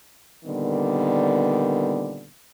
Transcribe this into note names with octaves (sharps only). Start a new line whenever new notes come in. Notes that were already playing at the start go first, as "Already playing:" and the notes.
A#2 D3 D#3 G3 B3